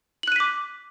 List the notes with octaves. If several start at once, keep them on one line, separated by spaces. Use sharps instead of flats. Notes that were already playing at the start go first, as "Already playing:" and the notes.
D6 F#6 B6 D#7 F#7